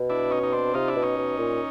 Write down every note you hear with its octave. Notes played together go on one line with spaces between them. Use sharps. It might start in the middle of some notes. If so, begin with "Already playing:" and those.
Already playing: B2
D4 E4
C#4 D#4
D#4
C4 D4
C3 D#4 F4
D4 E4
B2
C#4 D#4
B2
A#2